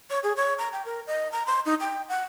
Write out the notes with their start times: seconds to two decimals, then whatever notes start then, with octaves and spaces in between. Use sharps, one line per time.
0.10 C#5
0.23 G#4
0.37 C#5
0.59 A#5
0.73 G5
0.85 A#4
1.07 D#5
1.32 A#5
1.46 C6
1.66 D#4
1.80 G5
2.09 F#5